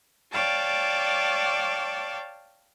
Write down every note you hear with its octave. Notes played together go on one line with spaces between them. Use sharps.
C#5 D5 F5 G5 A5